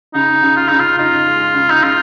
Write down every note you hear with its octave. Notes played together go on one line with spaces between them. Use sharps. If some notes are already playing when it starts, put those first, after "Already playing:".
C#3 D#4
C#3
F4
C#3 D#4
F4
D#4 F4
G#3
C#3
D#4
C#3 F4